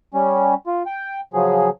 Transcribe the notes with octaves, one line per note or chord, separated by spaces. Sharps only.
G3 C#4
F4
G5
C#3 F3 F#3 G#4